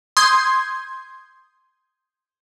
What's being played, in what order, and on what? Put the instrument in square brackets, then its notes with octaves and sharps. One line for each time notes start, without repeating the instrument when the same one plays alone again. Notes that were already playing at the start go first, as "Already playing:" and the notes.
[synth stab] C6 D#6 G6 G#6